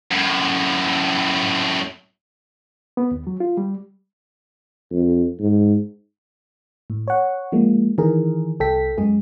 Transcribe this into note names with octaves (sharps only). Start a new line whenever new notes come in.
F#2 A2
B3
D#2
F#3
F4
G3
F2
G#2
A2
C#5 F#5
F3 G#3 A#3
D#3 E3 G#4 A#4
C2 A4 G5 B6
F#2 G#3 G#4